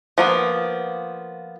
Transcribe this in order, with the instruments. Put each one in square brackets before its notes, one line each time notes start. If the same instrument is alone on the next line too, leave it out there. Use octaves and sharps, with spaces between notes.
[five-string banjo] F3 A#3 B3